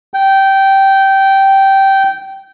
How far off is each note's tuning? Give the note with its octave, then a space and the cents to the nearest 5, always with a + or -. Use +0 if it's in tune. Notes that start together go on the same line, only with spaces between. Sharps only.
G5 -15